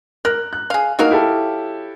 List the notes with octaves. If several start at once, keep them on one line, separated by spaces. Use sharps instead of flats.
A#4 F#6
F#6
G#4 F5
F#3 A#3 D#4 F#4 A#4 F5
E4 G4 A4